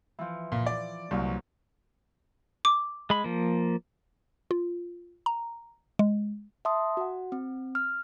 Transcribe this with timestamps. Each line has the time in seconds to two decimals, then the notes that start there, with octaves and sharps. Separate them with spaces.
0.19 E3 F3
0.52 A#2
0.66 D5
1.11 C2 A#2 F3 F#3
2.65 D6
3.10 G#3 B5
3.24 F3 A#3
4.51 F4
5.26 A#5
5.99 G#3
6.65 E5 A5 C6 D#6
6.97 F#4 F#5
7.32 C4
7.75 F6